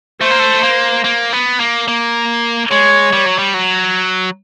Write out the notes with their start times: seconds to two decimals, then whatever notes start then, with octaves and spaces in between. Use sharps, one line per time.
0.21 A3 C5
0.31 A#3
0.39 A3
0.63 A#3
1.04 A#3
1.33 B3
1.60 A#3
1.88 A#3
2.70 G#3 C#5
3.13 G3
3.26 F#3
3.38 G3
3.54 F#3